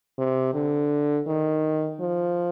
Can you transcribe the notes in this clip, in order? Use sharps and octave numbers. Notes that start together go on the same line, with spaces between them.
C3
D3
D#3
F3